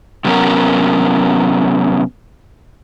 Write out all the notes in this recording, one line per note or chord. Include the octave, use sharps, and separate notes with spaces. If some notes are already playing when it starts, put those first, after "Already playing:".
C3 F#3 B3 C#4 A#4